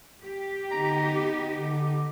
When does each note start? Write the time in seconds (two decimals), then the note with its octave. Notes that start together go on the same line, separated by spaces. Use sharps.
0.25 G4
0.71 D3 B3 D#4 A#5
1.15 D6
1.55 D3